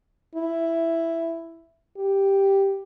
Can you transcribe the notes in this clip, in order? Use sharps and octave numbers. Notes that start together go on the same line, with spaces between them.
E4
G4